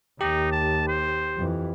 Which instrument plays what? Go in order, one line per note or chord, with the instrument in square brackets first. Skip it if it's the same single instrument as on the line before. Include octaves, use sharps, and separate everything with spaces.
[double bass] D#2 [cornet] D#4 [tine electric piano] G4
[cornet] A5
C5
[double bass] F2 E3